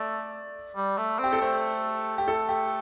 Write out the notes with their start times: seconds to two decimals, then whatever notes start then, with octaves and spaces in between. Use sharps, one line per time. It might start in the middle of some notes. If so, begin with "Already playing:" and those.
Already playing: A3 D5
0.76 G3
0.98 A3
1.19 C4 G4
1.32 A4
1.41 A3 C5
2.18 G4
2.28 A3 A4
2.49 G4